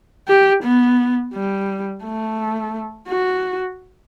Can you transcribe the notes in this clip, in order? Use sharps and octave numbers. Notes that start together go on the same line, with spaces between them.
G4
B3
G3
A3
F#4